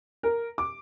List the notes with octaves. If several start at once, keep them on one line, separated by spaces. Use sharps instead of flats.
A#4
D6